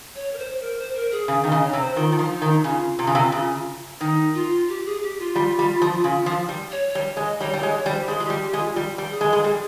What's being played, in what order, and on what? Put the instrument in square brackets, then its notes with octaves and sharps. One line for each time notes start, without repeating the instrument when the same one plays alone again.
[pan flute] C#5
A#4
C5
A#4
C5
A#4
G#4
[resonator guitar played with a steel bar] C#3 [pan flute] G#4
[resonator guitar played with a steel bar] D#3 [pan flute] D#5
[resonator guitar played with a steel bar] C#3
[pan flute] C#5
[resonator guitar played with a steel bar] C3
[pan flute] C5
[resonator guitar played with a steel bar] D#3 [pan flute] F4
[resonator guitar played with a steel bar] D#3
F3
[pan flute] D#4
[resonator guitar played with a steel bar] D#3
[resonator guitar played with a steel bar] C#3 [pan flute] F4
[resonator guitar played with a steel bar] C3
C#3
C3
C#3
[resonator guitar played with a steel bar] D#3 [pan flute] D#4
[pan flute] F4
G4
G#4
G4
F4
[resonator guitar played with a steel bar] G3
G3
F3
C#3
F3
G3
[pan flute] C#5
C#5
[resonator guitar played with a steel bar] G3
[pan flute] C#5
[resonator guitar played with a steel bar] G#3
[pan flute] D#5
[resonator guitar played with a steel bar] G3 [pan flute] C#5
[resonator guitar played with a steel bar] G3 [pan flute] C#5
[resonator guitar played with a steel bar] G#3
[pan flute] C#5
[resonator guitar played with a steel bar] G3
[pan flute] C5
G4
[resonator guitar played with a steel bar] G#3 [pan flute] G#4
[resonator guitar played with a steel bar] G#3 [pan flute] F4
[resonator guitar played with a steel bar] G3 [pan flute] G4
[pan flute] G4
[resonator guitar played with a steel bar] G#3
[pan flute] F4
[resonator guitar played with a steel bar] G3
G3
[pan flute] G#4
[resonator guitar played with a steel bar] G#3
G#3
G3